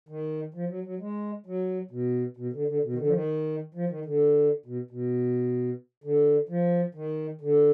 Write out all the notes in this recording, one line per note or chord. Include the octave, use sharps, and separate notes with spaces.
D#3
F3
F#3
F#3
G#3
F#3
B2
B2
D3
D3
B2
D#3
D3
F3
D#3
F3
D#3
D3
B2
B2
D3
F3
D#3
D3